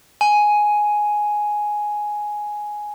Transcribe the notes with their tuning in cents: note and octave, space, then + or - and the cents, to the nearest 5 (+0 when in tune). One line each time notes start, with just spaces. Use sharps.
G#5 +5